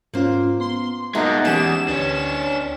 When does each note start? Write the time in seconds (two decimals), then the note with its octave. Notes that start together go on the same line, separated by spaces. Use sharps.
0.14 G#2 A#3 C#4 F4 C5
0.60 B3 C6
1.15 B2 G#3 A#3 D#4 E5
1.45 E2 C#4 G4 G#4 E7
1.88 D2 D4 B4 C#5